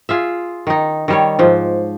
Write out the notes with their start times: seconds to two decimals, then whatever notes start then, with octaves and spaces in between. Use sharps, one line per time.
0.09 F4 G#4 E5
0.67 D#3 D#4
1.08 D#3 G3 C#5
1.39 G#2 F3